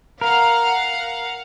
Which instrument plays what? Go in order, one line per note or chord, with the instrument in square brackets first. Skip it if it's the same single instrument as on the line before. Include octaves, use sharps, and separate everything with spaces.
[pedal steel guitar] A#4 [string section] F5 F#5